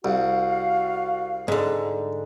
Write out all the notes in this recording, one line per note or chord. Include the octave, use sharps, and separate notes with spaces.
C2 F#4 F5
G#2 D3